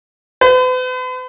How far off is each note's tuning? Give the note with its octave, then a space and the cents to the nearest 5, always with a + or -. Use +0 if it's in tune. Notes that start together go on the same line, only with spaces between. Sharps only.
B4 +45